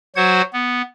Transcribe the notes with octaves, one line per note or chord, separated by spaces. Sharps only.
F#3 F#4 C5 F#5 G#6
B3